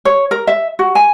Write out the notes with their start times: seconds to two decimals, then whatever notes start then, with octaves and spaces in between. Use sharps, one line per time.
0.05 C#5
0.31 A#4
0.47 E5
0.79 F#4
0.95 G#5